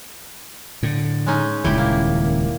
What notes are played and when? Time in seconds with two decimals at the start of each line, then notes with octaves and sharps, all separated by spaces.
0.83 A2 D3
1.26 G#3 C#4 D#4
1.64 D#1 C#2 D#3 E4 G4
1.78 A#3